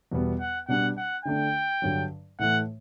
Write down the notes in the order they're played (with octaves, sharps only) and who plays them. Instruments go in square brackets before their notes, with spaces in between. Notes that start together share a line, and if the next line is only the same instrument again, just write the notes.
[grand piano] E2 B2 G3 B3
[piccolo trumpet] F#5
[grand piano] B2 G3 D4 [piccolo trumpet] F#5
[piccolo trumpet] F#5
[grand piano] D3 A3 D4 [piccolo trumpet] G5
[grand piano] G2 D3 F#3
[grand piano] A2 E3 A3 [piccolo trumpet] F#5